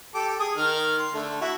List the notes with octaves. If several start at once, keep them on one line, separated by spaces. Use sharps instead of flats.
G4 A4 D6
G#4 D#6
D#3 F6
C6
D3 A3
E4 F#4